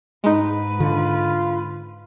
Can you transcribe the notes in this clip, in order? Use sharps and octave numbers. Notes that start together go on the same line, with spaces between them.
G#2 G#3 D#4 B4
D3 F4